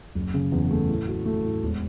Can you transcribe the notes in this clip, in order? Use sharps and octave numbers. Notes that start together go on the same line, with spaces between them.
F#1
C#3
E2
A3
A2
F#4
A3
A2
E1